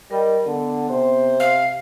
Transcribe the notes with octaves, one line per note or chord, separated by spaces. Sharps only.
G3 A#4 D#5 G5
D3 B3
C3 C5
F5